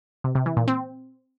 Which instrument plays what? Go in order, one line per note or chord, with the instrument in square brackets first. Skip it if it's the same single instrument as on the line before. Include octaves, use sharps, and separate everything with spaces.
[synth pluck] C3
C3
E3
A#2
C4